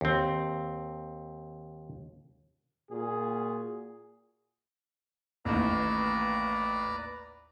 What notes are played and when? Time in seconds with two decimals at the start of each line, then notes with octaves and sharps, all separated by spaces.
0.01 D#2 C4
2.90 A#2 F#4 G#4
5.45 A1 D#2 B4 D5 A#5